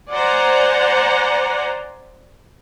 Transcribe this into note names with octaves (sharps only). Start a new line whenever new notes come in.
C5 D5 F#5 G#5 A#5